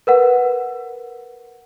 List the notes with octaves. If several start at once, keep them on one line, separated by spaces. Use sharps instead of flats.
A#4 B4 F#5